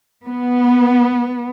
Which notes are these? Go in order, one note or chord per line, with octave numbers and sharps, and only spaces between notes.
B3